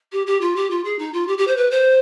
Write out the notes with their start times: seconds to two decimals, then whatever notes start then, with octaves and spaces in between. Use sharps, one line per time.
0.12 G4
0.27 G4
0.41 F4
0.56 G4
0.70 F4
0.85 G#4
0.99 D#4
1.13 F4
1.28 G4
1.38 G4
1.47 C5
1.57 B4
1.71 C5